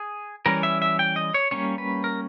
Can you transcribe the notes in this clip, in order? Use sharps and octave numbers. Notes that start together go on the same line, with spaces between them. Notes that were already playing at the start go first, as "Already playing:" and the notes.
Already playing: G#4
E3 G3 C#4 A#4
E5
E5
G5
D#5
C#5
G3 A#3 C#4 C#5
B4
A#4